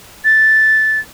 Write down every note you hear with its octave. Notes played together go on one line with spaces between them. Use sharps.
A6